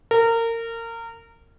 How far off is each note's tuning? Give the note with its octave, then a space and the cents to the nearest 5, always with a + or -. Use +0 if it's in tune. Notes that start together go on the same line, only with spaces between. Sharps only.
A#4 -25